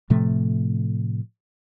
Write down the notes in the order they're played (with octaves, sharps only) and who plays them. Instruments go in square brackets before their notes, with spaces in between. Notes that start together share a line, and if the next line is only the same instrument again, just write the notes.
[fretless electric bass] A2 C3 F3 A3